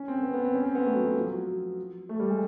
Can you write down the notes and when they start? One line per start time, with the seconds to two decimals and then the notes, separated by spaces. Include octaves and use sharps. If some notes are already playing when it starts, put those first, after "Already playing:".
Already playing: C#4
0.08 C4
0.23 B3
0.34 B3
0.44 C4
0.54 C#4
0.65 C4
0.75 B3
0.85 A3
0.95 F#3
1.06 F#3
1.16 F3
1.27 F#3
2.09 A3
2.20 G3
2.30 G#3